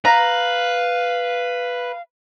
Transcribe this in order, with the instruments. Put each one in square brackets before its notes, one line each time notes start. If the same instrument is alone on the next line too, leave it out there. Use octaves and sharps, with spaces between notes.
[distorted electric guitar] B4 [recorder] F5 [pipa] A#5